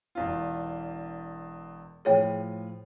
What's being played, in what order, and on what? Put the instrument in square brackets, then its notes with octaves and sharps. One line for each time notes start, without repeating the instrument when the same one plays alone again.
[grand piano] E1 E2 F4
[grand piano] A2 F3 D#7 [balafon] G#4 C#5 G5